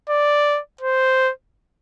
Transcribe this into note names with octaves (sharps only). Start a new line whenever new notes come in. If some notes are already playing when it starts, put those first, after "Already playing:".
D5
C5